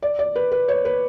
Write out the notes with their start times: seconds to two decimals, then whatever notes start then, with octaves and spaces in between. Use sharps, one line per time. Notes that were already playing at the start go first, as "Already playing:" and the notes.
0.02 D5
0.19 D5
0.35 B4
0.52 B4
0.68 C#5
0.85 B4